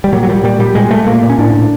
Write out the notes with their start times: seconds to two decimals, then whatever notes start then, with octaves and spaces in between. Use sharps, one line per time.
0.04 G3
0.12 A#2 F#3
0.23 F#3
0.29 A#2 G3
0.44 A#2 G3
0.59 A#2 G3
0.75 A#2 G#3
0.91 A#2 A3
1.07 A#2 A#3
1.23 A#2
1.30 C#4
1.38 A2 D4
1.54 A2